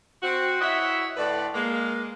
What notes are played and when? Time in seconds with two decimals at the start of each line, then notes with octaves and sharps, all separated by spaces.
0.23 C4 F#4
0.61 E4 C#5 D#5 E5 F#5
1.17 A2 D3 B4 D5
1.54 G#3 A#3